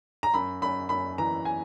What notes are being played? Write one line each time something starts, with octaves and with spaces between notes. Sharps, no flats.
A#5
F#2 B5
F#2 B5
F#2 B5
E3 A#5
G#5